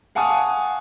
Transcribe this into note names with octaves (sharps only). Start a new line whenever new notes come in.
F5 F#5 G#5 A5 C#6 D#6